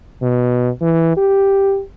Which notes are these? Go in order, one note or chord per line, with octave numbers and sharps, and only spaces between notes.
B2
E3
G4